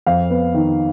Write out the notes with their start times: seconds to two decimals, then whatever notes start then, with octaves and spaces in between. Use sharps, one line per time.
0.07 F2 F5
0.30 B3
0.54 D#3